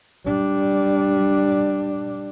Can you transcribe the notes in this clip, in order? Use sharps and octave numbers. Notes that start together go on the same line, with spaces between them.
G3 D4